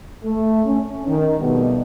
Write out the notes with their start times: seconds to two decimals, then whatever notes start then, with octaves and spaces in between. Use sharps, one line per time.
0.23 A3
0.64 C#4
1.06 D#3
1.39 F2 B2 G3 A3 B3 D#4